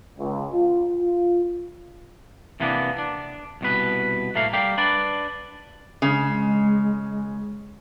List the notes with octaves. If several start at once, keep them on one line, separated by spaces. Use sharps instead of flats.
C#2
F4
F4
C3 E3 A#3 B3 D4
D4
C2 B2 B4
A2 A3 A#3 F5
G3 G4 A#4 F5
D4 B4 D5
C#3 G#3